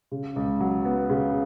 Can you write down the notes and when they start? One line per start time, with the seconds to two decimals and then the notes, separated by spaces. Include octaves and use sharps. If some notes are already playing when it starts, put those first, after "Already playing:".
0.12 C#3
0.36 C#2
0.61 F#3
0.85 B3
1.10 C#3